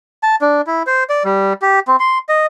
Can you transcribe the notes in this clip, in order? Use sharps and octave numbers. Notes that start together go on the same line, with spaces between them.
A5
D4
E4
C5
D5
G3
G4
C4
C6
D#5